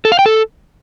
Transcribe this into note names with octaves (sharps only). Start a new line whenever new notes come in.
A4
F5
G5
A4